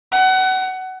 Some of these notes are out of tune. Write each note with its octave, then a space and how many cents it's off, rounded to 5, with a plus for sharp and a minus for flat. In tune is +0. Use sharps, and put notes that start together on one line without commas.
F#5 +25